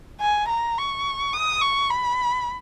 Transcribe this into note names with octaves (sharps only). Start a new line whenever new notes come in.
G#5
A#5
C#6
D#6
C#6
B5